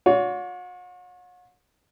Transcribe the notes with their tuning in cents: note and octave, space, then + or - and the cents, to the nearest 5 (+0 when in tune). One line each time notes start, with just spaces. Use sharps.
F#4 -45 C#5 +40